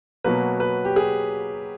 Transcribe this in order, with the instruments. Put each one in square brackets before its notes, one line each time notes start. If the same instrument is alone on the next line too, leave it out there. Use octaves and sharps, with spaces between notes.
[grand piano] B2 F#3 A#3 B4
B4
G4
G#4